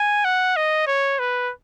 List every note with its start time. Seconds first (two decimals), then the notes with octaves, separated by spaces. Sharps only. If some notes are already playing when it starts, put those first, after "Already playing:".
Already playing: G#5
0.25 F#5
0.57 D#5
0.87 C#5
1.19 B4